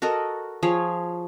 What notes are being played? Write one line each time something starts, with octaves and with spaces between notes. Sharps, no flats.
F#4 A4 A#4 D#5
F3 G#4 C#5